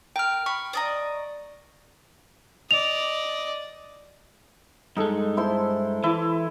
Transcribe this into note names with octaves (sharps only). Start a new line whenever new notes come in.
A#4 G5 F6
B5 C#6
D5 D#5 A#5
D5 D#5 F7
G2 G#3 D#4 A4
E4 C5 C6
E3 E4